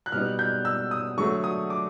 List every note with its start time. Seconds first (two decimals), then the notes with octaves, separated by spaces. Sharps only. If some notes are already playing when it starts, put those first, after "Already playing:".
0.06 F#6
0.12 B2 G3 B3 D#4 F6
0.39 G6
0.65 E6
0.91 D#6
1.17 D3 F#3 A3 C#6
1.44 D#6
1.70 D6